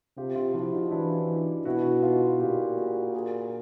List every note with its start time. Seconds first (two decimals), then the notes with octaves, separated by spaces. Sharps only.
0.17 C3 F4 G4
0.36 F4 G4
0.54 F3 E4 F#4
0.73 D#4 F4
0.91 E3 D4 E4
1.65 B2 E4 F#4
2.03 D#4 F4
2.40 A#2 F4 G4
2.78 F#4 G#4
3.14 G#4 A#4